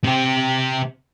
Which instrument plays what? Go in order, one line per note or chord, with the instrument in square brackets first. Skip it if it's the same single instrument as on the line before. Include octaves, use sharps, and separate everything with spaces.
[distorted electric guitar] C3 G4